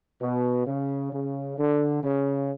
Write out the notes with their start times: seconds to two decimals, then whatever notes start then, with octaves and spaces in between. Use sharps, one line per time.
0.21 B2
0.67 C#3
1.12 C#3
1.58 D3
2.03 C#3